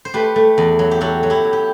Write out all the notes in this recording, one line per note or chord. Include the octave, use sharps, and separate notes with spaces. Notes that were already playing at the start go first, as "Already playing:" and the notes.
C5
A3 G4 B4
A3
E2
F#3
G4
F#3 F#4 A4
F#3
E4 G4
F#3
G4